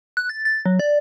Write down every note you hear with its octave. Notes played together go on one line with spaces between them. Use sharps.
F#6
A6
A6
F#3
D5